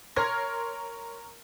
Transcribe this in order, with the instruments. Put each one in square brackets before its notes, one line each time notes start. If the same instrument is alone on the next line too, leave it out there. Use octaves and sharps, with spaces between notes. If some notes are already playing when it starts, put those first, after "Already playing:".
[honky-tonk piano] A#4 C#5 C6 F6 G#6 A#6